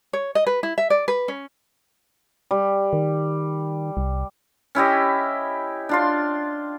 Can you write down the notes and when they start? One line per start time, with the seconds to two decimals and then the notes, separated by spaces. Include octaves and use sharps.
0.13 C#5
0.35 D#5
0.47 B4
0.63 E4
0.78 E5
0.90 D5
1.08 B4
1.28 C#4
2.51 G3
2.93 D#3
3.97 C2
4.75 C#4 E4 G4 D#5
5.89 D4 F4 C6